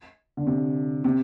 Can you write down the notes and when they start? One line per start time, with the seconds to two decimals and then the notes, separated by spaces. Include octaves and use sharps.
0.37 D3
0.47 C3
1.04 C3